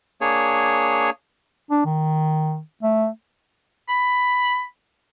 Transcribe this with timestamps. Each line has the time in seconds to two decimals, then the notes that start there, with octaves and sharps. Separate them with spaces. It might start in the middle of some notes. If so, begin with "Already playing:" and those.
0.21 A#3 D4 G#4 C#5
1.71 D4
1.86 D#3
2.83 A3
3.89 B5